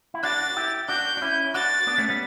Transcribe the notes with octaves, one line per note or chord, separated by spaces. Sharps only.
E4
D4 F#4 A6
E4 G4
D4 F#4 G6
D4
C#4 E4
E4
D4 F#4 A6
B3 D4
A3 C#4
G3 B3